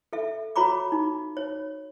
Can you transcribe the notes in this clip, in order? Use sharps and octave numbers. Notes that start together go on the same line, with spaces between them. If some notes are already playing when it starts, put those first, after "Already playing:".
A4 E5
F#4 C#5 A#5 B5 D6
D#4
C#5